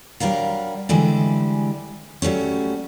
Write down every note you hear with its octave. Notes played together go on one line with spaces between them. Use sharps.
F#3 G3 D4 A#4 F5
D3 E3 G3 G#3
F#3 G3 A3 C#4